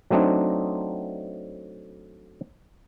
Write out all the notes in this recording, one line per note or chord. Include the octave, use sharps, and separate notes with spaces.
F#3 A3 C4 D4 D#4